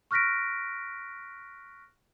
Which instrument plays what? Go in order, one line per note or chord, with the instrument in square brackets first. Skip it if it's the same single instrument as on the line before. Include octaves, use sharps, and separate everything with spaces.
[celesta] C#6 F6 F#6 A#6 B6 D7